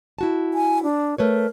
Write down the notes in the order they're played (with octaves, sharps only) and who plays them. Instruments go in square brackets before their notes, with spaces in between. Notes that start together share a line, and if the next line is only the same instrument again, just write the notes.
[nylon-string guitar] E4 F#4 A5
[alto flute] G#5
D4
[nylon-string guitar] A3 B4 C#5 [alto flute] A#4